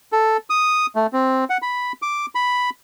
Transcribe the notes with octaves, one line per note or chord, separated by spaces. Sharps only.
A4
D#6
A3
C4
F#5
B5
D6
B5